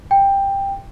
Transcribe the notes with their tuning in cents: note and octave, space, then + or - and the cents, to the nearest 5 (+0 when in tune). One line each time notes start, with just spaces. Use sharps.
G5 +10